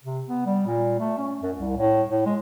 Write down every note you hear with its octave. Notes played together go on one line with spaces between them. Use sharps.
C3
B3
G3
A#2
A3
C#4
F#2
C2
A2
A2
G#3